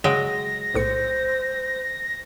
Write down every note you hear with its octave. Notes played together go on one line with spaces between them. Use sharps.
C#3 F#3 G#3 G5 A#6
B1 A2 C5 C#7